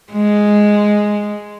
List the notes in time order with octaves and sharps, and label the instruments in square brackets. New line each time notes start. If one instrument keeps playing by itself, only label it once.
[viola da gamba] G#3